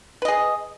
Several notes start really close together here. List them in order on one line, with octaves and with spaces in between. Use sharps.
B4 D#5 G#4